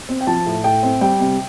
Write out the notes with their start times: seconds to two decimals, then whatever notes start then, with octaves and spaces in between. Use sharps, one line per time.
0.09 C4
0.21 G5
0.27 F3 A5
0.46 A2
0.64 A2 G5
0.83 C4
1.01 G3 G5
1.20 C3